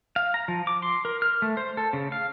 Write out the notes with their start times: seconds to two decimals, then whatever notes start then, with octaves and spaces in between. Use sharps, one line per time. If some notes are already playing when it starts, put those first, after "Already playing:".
0.16 F5
0.34 A#5
0.48 F3
0.67 D6
0.82 C6
1.05 A#4
1.22 F6
1.42 A3
1.57 C5
1.77 A4
1.93 C#3
2.12 F5